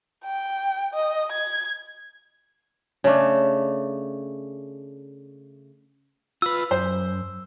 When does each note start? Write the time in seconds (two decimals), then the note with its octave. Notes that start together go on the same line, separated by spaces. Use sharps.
0.24 G5
0.94 D#5
1.32 G#6
3.04 C#3 A3 D4
6.42 F4 B4 E6
6.71 F#2 C5